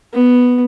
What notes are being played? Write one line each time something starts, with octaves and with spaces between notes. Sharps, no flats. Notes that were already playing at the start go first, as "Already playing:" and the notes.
B3